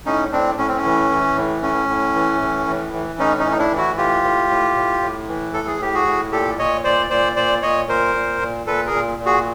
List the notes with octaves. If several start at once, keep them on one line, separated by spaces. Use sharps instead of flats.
A2 C#4 D#4
A2 C4 D4
A2 C#4
C4
C#4
E3
E3
A2
A2 C#4
A2
E3
A2
E3
E3
A2 C#4 D#4
C#4 D#4
A2
D#4
D4 E4
E3
E4 F#4
A2 F4 G4
A2
A2
A2
A2
E3
A2 A4
G#4
A2 G4
F#4 G#4
A2
A#2 G4 A4
A#2 C#5 D#5
A#2 C5 D5
A#2 C5 D5
A#2 C5 D5
A#2 C#5 D#5
A#2 A#4 C5
A#2
A#2
A#2 A4 B4
G#4 A#4
A#2
A#2
F#4 G#4